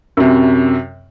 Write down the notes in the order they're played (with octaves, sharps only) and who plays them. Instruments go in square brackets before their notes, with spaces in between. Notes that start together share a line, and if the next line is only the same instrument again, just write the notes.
[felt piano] F#2 C3